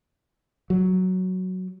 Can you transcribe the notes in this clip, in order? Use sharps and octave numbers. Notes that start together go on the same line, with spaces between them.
F#3